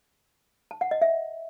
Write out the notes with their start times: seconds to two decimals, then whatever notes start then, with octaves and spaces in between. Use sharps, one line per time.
0.71 A5
0.81 F#5
0.91 D#5
1.02 E5